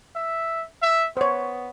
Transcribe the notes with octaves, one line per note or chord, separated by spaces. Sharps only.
E5
E5
B3 C5 C#5